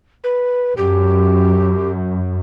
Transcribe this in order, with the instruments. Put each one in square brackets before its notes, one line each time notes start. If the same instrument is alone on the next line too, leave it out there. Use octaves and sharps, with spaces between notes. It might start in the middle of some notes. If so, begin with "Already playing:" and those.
[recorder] B4
[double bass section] F#2 [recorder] G4